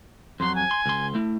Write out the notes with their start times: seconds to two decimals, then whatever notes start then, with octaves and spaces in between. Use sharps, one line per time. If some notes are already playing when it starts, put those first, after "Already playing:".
0.40 F2 F#3 C6
0.55 G#5
0.71 C6
0.86 C#2 C6
1.15 A3 E4